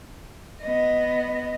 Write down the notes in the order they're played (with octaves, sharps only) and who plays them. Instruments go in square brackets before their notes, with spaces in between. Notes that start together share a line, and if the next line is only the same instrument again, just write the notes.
[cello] B3 D#5